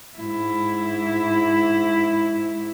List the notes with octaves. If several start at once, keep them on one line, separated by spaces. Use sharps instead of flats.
G#2 E4